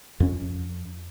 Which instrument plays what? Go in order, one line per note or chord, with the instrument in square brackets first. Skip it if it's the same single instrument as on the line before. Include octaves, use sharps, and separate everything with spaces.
[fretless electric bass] F2 C#4